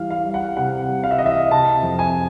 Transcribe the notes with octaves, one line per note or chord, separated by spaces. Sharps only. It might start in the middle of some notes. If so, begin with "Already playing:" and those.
Already playing: E3 G3 F5
F5
G3
F#5
C3 F#5
G3
F5
E5
E3 D#5
E5
C3 A5
F2
G#5